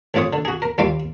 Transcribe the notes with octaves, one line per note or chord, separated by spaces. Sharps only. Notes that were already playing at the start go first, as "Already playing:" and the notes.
A1 C4 F4 C#5 D#6
D3
F#4 G#4
A#4
D#2 G3 F4 D5 F5 D6